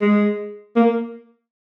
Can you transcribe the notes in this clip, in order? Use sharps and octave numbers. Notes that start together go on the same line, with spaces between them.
G#3
A#3